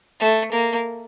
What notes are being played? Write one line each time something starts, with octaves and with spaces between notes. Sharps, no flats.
A3
A#3